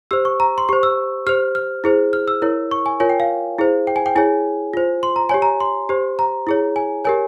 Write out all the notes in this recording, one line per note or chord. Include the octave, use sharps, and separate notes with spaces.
G4 C5 E6
C#6
A#5
C6
G4 C5 C#6
E6
G4 C5 F6
F6
E4 G#4 C5
F6
E6
E4 A#4 C#5
C#6
G#5
F4 A#4 C#5 G#5
G5
F5
E4 G#4 C5
G5
G#5
G5
E4 G#4 C#5 G#5
F4 C5
C6
A#5
G4 C#5 G#5
A#5
C6
G4 C5
A#5
E4 G#4 C#5
G#5
G4 A#4 C#5 G#5